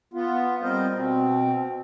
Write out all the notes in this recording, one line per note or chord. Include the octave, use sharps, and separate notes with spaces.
B3 F4
G3 C4 A#4 C5 D#5
B2 C4